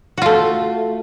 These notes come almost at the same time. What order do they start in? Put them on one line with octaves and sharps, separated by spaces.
F#4 F4 A3